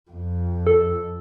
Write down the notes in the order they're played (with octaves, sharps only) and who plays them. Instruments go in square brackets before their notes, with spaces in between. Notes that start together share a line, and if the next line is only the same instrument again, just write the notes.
[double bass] F2
[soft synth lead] A4